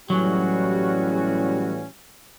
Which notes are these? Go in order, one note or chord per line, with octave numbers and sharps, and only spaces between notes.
A2 E3 F#3 G3 C#4 F#4